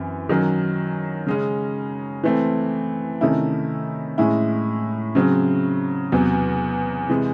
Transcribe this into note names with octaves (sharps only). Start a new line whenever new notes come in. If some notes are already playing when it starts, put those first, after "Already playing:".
Already playing: F#2 E3 C4
D#3 F#3 C#4
C#3 G#3 C#4
E3 A3 C4
C3 D#3 A3 C#4 E4
A2 G#3 C#4 E4
C#3 F#3 C4
E2 C3 F#3
C3 E3 G#3